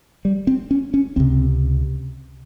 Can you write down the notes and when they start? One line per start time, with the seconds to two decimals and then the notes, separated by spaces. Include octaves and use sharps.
0.25 G3
0.47 C4
0.71 C#4
0.94 C#4
1.16 C#2 C3 C4